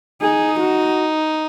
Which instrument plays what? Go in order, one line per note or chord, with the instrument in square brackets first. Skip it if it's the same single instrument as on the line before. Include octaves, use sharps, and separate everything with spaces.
[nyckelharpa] D#4 [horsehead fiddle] G#4
[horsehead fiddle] F#4